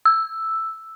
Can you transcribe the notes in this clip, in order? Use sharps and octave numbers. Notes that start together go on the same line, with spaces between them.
E6